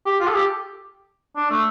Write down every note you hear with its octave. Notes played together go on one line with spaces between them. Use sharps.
G4
F4
A4
G4
D4
A3